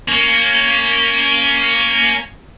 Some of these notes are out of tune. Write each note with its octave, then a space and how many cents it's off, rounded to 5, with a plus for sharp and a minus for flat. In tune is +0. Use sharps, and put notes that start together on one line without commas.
A#3 -5 C#4 +15